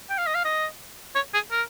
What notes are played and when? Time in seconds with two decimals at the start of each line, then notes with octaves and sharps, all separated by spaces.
0.10 G5
0.18 F5
0.27 D#5
0.35 F5
0.45 D#5
1.15 C#5
1.34 G#4
1.51 A#4